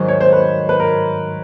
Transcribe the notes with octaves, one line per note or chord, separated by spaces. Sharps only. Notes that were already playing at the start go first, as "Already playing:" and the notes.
Already playing: G#2 D#3 F#3 C5
C#5
C5
B4
B4
A#4